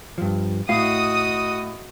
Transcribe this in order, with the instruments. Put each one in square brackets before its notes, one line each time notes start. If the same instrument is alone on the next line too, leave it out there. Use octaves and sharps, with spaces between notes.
[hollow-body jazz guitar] G2 F3
[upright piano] A2 [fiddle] F#4 D#5 [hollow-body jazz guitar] F5 [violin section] D#6